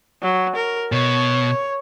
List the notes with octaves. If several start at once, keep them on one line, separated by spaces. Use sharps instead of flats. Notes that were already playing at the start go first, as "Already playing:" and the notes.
F#3
A#4
B2 C#5